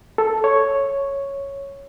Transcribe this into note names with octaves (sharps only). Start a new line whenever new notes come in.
A4
C#5